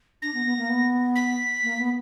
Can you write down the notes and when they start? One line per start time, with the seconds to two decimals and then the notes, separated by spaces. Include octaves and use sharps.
0.22 D4 A#6
0.34 B3
0.45 B3
0.58 A#3
0.69 B3
1.15 B6
1.63 A#3
1.78 B3